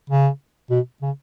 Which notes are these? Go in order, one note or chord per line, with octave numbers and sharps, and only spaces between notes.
C#3
B2
C#3